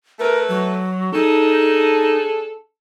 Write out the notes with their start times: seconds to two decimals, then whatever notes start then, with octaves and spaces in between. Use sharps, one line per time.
0.19 A3 E4 A#4 B4
0.49 F#3
1.13 D4 D#4 G#4 A4